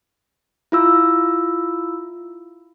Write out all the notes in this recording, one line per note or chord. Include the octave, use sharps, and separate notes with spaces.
E4 F4 E6